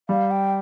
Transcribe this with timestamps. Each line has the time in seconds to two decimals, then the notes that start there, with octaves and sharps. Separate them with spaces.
0.09 G3 F5
0.31 G5